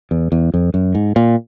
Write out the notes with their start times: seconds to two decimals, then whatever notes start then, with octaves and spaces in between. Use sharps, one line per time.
0.11 E2
0.32 E2
0.54 F2
0.74 F#2
0.95 G#2
1.16 A#2